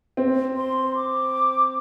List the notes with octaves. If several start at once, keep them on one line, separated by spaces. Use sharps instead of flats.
C4
C6
D6